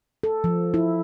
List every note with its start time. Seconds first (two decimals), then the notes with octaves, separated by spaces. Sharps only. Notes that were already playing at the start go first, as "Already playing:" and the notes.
0.23 A4
0.44 F3
0.74 E4